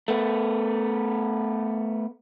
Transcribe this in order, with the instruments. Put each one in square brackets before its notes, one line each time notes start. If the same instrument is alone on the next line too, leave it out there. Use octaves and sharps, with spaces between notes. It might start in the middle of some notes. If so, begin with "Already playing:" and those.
[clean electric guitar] A3 B3